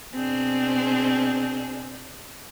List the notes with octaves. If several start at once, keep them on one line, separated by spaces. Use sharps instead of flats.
B2 C4 D4 G#4